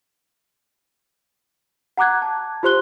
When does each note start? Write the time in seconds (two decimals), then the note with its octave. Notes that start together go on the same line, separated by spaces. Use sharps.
1.97 F#5 A#5 D6 F#6 G#6
2.22 A5
2.63 F4 G4 C5 C6 F#6 G7